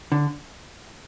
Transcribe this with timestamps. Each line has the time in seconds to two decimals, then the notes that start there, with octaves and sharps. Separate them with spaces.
0.12 D3